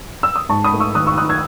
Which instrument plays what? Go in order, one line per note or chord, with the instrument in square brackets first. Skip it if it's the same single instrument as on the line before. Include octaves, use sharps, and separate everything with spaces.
[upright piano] E6
D#6
G#2 A5 C#6
B5 D#6
A3
C#6 E6
D#3 D#6 F#6
C#6 E6
D#4 D#6 F#6
E6 G#6